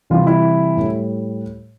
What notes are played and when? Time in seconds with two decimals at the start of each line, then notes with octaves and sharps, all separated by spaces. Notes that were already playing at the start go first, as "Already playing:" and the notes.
0.10 C3 E3 G3 F4
0.27 E4
0.77 A2
0.82 G3